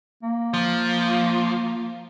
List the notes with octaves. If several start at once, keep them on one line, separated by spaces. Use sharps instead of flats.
A#3
F3